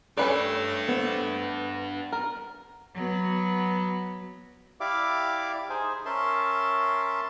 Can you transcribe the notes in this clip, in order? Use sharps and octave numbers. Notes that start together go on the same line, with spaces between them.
A3 C#4 D4 G4 B4 D5
B3 C5
A#4
F#3 B3
E4 G4 D5 E5 F5 D6
D#4 G#4 C5 G#5
C#4 A#4 E5 A5 C6